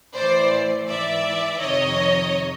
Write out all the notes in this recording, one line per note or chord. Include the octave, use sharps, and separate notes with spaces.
A2 E3 C5 D5
G#2 E3 D5 E5
F2 C3 D#3 C#5 D#5